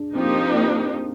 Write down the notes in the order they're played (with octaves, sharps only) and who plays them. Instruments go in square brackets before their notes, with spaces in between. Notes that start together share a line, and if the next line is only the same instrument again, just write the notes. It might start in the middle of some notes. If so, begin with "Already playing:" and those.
Already playing: [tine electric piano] D4 G#4
[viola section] F3 A#3 D#4 G4 [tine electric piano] C4